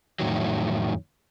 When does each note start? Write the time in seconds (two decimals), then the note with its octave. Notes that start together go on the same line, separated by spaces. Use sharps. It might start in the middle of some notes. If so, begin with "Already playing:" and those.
0.20 F2 A2 D#3 F#3